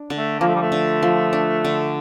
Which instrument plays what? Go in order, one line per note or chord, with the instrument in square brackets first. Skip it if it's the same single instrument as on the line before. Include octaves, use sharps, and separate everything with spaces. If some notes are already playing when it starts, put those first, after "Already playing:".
Already playing: [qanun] D4
D3
[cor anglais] A3
[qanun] F3 [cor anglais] A#3
[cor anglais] A3
G3
A3
[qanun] D3
F3
D4
D3